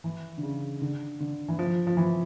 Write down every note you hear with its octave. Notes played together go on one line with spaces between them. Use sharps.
E3
D3
C#3
D3
D3
E3
F3
F3
E3